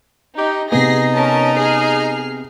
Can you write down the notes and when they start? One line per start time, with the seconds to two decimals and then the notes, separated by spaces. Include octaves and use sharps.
0.38 D#4 G4
0.72 C3 B3 D#4 G#4 A#6 C7
1.13 C#4 A#4 A5
1.57 G#4 F6 C7